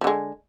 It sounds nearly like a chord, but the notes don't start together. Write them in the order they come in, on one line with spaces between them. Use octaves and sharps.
F3 D3 G#3